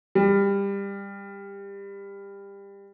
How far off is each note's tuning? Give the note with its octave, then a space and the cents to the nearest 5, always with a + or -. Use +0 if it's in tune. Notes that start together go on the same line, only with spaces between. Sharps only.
G3 +20